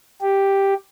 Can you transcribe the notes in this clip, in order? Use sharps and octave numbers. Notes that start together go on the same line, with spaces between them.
G4